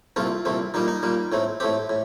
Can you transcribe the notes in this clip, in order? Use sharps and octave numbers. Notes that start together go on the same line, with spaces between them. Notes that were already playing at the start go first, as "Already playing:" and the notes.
C2 A#2 A3 C4 F4
C2 A#2 A3 C4
A#2 G3 A#3 D#4
D#4
A#2 G3 A#3
A2 A3 C4
A2 A3 C4 G4
A2